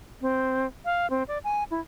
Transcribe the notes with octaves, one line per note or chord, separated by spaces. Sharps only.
C4
F5
C4
D5
G#5
E4